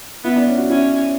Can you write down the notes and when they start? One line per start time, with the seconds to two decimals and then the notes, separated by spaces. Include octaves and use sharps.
0.24 B3 E4
0.36 D4
0.47 C#4
0.58 F#4
0.70 C#4 E4